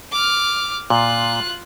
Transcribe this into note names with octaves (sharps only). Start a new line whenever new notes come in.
D6 F6
A#2 F4 F#6